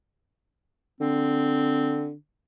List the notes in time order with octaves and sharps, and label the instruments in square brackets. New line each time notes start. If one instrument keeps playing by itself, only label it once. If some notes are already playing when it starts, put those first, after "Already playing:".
[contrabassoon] D3 [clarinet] C4